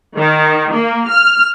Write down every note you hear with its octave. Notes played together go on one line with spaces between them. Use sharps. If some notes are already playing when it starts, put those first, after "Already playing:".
D#3
A#3
F6